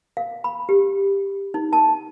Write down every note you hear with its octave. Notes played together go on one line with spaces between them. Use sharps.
F5
B5
G4
D#4
A5